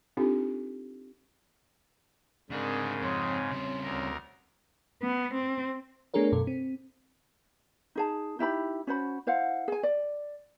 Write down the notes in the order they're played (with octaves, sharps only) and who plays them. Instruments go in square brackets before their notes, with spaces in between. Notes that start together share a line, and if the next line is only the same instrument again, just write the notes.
[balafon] C4 D4 D#4 F4 G4 A4
[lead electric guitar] D2 D4 [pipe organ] G#2 C#3 [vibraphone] C4 A#4
[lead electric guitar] F2 [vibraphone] C4 C#5 C6
[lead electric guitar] C#3 G3
[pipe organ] D2 A#4
[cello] B3
C4
[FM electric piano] A3 B3 D4 G#4 A#4 C#5
F#2 B2 A4
C4
[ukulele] D#4 G#4 A5
D#4 E4 G4 B5
C#4 F#4 C5 B5
E4 C5 F5 F#5
G#4 G#5
D5